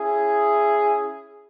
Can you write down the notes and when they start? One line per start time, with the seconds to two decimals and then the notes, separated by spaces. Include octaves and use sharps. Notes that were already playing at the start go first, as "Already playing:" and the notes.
Already playing: C#4 E4 G#4